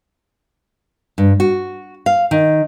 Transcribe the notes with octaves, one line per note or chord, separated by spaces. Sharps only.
G2
F#4
F5
D#3